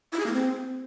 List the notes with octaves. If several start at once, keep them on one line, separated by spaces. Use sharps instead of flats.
E4
G#4
A#3
C4